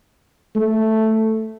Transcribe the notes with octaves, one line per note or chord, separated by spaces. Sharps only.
A3